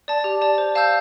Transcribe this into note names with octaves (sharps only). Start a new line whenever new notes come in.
D5 A5
G4
D5 A5
C5
F5 A5 E6 G6